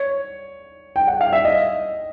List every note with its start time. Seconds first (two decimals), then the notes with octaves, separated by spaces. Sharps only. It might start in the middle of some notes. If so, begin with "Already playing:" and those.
Already playing: C#5
0.96 G5
1.07 F#5
1.21 F5
1.33 E5
1.45 D#5